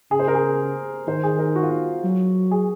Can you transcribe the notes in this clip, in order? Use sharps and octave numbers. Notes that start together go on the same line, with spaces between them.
C#3 G#4
C5
A#4
G#4
D#3 C5
G#4
A#4
F#4
F4
F#4
F#3
G#4